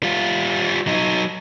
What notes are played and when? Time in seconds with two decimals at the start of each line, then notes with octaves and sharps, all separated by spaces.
0.03 G3 F4
0.87 F#3 D#4